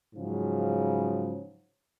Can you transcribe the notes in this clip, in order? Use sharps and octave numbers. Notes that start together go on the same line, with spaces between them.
G#2 C#3 F3 F#3